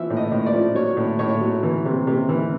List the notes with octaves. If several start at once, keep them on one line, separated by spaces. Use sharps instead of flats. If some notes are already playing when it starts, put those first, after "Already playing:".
Already playing: E3 F3 E5
A2
D#5
A2
D5
F3
F#3 C#5
A2
A2 C#5
F#3
E3
C3
C3
E3